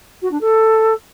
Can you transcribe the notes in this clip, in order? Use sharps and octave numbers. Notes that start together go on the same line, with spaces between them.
F#4
D4
A4